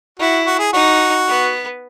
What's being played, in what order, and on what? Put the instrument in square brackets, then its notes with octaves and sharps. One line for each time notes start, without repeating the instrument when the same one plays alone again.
[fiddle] E4 [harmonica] F#4
[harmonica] F#4
G#4
[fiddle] D#4 [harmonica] F#4
[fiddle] B3